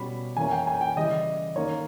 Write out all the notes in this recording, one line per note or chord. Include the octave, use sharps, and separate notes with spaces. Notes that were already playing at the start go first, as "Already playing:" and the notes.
Already playing: B2 G3 C#4 B5
E3 A#3 C#4 G#5
G5
G#5
G5
C#3 E3 G3 D#5
D#3 A#3 C#4 C#5